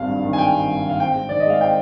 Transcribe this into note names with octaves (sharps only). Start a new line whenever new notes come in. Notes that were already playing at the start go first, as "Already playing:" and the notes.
Already playing: G#1 G3 F5
G2
D#3
G#5
G3 G5
G#1
G2
D#3
F5
C4 G5
G#2
D#3 D5
D#5
G#3 F5
C4 G5